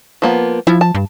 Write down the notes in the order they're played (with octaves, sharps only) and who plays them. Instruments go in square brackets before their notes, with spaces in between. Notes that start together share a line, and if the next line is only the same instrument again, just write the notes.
[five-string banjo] F3 A#3 B3
[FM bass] F3 [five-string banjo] E4
[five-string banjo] A5
[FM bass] G2